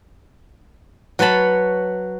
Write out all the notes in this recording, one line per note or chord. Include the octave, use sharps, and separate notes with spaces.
F#3 B4 C#5 A5 B5